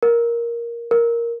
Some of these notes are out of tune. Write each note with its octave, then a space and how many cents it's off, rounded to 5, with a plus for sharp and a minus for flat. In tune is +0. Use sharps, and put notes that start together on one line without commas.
A#4 +10
A#4 +5